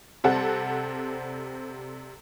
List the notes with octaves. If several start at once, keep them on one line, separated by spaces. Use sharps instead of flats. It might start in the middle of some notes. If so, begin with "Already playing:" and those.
C3 G3 C4 A4 F#5